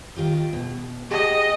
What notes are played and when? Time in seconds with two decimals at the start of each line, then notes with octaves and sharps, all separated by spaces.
0.16 D#3 F4 G4
0.53 B2
1.11 G4 G#4 D#5 F#5